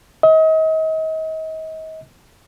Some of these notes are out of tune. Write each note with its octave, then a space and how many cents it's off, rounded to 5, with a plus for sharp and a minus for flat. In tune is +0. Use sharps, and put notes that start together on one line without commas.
D#5 +35